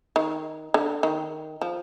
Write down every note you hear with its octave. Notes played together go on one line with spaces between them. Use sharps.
D#3
D3
D#3
F3